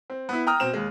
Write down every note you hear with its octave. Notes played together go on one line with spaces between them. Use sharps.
C4
B3 E4
G5 A#5 D#6 F6
B2 C4 E7
D#2 G#3